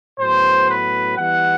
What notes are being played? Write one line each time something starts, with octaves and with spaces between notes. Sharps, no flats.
A2 F#3 B3 C5
B4
E3 G3 B3 F#5